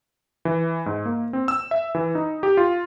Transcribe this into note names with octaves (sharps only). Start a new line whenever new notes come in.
E3
G#2
A#3
C4
E6
E5
E3
D#4
G4
F4